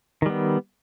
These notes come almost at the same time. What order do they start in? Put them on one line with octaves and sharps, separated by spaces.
D#3 G3 B3